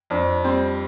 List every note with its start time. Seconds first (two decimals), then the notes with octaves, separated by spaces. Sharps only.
0.10 F2 D4
0.44 G3 C4